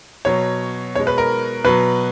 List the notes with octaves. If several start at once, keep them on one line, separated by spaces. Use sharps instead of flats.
B2 F#3 C#5
B2 G#3 C#5
B4
A#4
B2 F#3 B4